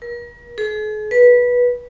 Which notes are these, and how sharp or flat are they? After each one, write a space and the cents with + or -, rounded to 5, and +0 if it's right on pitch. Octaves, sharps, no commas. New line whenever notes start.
A#4 +40
G#4 +45
B4 -15